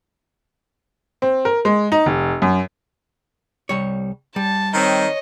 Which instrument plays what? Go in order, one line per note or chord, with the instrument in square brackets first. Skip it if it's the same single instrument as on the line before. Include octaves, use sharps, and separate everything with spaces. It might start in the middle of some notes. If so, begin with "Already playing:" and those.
[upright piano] C4
A#4
G#3
D#4
F1
F#2
[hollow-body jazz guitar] C2 G3 C#5
[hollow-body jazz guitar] G3 [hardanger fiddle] A5
[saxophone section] D#3 C4 [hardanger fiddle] C#5 D#5